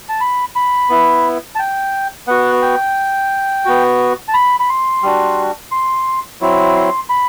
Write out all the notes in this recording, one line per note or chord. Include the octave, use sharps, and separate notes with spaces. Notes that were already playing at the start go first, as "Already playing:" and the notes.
A5
B5
B5
B3 E4
A5
G5
B3 F#4 F#5
G5
B3 F#4
A5
B5
B5
C6
G3 D4 F#4
C6
F#3 C4 E4
C6
B5